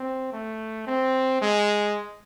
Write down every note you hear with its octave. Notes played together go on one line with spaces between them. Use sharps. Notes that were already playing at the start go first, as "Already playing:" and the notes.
Already playing: C4
A3
C4
G#3